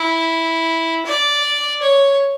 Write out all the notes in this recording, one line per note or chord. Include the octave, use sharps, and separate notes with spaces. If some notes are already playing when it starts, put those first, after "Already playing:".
Already playing: E4
D5
C#5